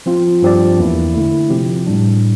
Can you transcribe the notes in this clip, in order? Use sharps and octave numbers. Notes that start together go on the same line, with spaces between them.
F3 C4 F4
G2 F3 C4 G4 D5
E2 E3 A#3 E4
D3 A3 E4
C3 F3 C4 G4
A2 G3 D4